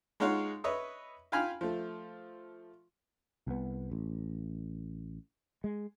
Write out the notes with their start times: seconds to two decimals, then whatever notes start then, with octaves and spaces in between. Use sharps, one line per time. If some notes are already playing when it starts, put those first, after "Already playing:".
0.20 G#3 D#4 F4 C#5 F5 F#5
0.64 B4 C#5 D#5 E5
1.32 F4 F5 G5 G#5 B5 F6
1.61 F3 A3
3.47 C2 B3
3.91 A1
5.64 G#3